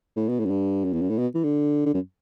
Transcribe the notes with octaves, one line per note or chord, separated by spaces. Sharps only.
A2
B2
A2
F#2
G2
F#2
E2
F#2
A2
B2
E3
D3
D3
F#2